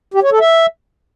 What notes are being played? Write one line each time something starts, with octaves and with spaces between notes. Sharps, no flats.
G4
C#5
A4
E5